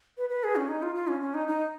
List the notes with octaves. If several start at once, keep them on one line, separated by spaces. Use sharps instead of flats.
B4
B4
G#4
C#4
D#4
F4
F4
C#4
C#4
D#4
D#4